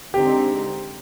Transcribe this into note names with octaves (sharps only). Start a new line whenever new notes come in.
D3 G#3 C4 D#4 G4